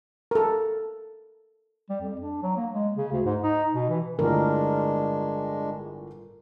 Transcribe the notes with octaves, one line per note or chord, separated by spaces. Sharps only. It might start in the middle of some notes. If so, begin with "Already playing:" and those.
A4 A#4
G3
F2
D4
F#3
A#3
G#3
C#3
D2
G#2
D#4
B2
E3
G1 A2 G#3 D4 F4 A#4